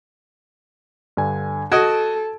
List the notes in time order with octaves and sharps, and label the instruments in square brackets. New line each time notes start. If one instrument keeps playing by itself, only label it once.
[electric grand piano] G2 D3 G#5
[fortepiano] F#4 D#5 [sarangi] A4 [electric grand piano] G#6 D7